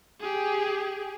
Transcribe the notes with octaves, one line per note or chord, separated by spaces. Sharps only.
G4 G#4